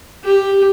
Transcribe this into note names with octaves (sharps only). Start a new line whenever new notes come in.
G4